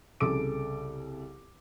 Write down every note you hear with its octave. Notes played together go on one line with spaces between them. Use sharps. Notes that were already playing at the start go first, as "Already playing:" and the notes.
C2 C#3 A4 D6 D7